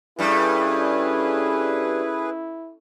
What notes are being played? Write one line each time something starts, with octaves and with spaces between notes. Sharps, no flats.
G2 G3 C#4 E4 G#4 A4 B4